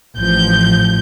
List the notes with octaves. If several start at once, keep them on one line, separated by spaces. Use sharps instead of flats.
A1 F3 G6